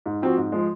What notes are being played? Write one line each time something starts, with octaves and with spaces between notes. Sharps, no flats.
G#2
F3 C4 F#4
G#2
F3 G#3